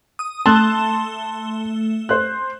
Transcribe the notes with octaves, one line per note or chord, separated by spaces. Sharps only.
D#6
A3 A5 C6 F#6 E7 G7
C5 F#6